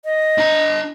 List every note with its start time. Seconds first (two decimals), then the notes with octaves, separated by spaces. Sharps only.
0.05 D#5
0.38 D4 A#5